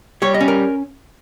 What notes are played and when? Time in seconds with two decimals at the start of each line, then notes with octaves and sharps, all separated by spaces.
0.22 G3 C#5
0.34 D#5
0.41 C#4
0.48 A#4